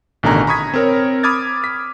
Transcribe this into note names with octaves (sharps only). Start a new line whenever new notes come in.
A1 B2 D3 D#3 G#5 A#5
A#5 B5 C#6 D#6 G#6 B6
C4 A#4 C#5
B5 D6 D#6 F6 G#6 A6
B6